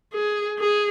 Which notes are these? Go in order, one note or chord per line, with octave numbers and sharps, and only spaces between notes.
G#4
G#4